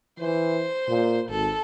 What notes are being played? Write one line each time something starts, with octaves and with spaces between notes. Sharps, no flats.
E3 C5
A#2
G#1 A4